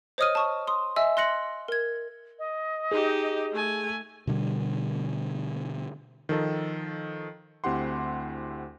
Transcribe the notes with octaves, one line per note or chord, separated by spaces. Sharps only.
C5 C#5 D#5 D#6 F6 D#7
A5 C#6 D#6
C6 D#6
D#5 E5 G#5 E6
C6 F#6 A#6 C#7 F#7
A#4 G#6
D#5
D#4 G4 G#4
A3 G#5
B2 D3 G3
D#3 F3 A4 D#5
D2 C4 E4 G4 F#5 C6